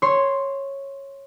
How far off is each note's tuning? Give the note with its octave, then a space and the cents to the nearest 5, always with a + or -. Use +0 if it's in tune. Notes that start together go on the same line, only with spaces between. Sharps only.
C#5 -10 C6 +0